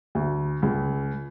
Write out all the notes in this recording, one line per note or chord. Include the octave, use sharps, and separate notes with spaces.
D2
C#2